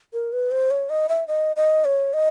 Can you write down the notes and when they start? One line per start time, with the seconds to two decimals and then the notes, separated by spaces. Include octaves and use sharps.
0.13 A#4
0.33 B4
0.51 C5
0.71 C#5
0.89 D#5
1.09 E5
1.28 D#5
1.56 D#5
1.85 C#5
2.14 D#5